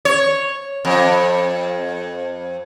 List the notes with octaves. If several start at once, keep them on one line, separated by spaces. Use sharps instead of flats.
C#5
F2